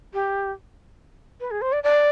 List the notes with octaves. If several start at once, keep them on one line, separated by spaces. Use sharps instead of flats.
G4
B4
G#4
C5
D5
D5